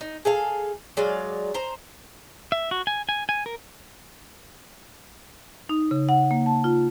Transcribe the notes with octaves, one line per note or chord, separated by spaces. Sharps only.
D#4
G#4 A4 F5
F#3 G#3 D5 F5
C5 A#5
E5
F#4
G#5
G#5
G#5
A#4
D#4
C#3
F#5
A#3
A5
F4